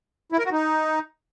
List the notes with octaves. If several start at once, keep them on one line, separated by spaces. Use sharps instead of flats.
E4
A#4
F#4
D#4